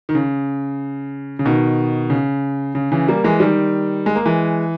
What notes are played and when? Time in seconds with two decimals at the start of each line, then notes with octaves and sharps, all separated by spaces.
0.09 D#3
0.15 C#3
1.39 C#3
1.45 B2 D#3
2.10 C#3
2.75 C#3
2.92 C#3 E3
3.08 G3 A#3
3.24 E3 G#3
3.40 D#3 G3
4.06 G#3
4.15 A#3
4.26 E3 G#3